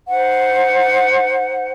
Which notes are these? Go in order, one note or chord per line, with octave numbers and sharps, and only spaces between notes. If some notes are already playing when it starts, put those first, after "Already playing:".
D#4 C5 F#5